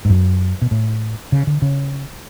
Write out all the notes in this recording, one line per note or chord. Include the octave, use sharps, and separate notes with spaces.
G#2
F#2
B2
A2
C#3
D3
C#3